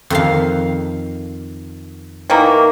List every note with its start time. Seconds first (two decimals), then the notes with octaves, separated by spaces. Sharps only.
0.10 F2 D#3 F5
2.30 D#3 E3 A#3